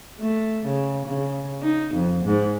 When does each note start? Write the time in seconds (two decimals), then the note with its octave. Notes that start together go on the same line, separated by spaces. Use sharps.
0.20 A3
0.66 C#3
1.06 C#3
1.62 D#4
1.94 F2
2.25 G#2